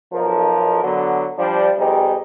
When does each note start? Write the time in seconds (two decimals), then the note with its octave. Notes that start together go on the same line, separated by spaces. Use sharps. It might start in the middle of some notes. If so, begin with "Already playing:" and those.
0.13 B1 F3 A#4
0.84 D3 F#3 B3
1.38 F3 G3 D4
1.77 F2 B2 G3 D#4 G4 G#4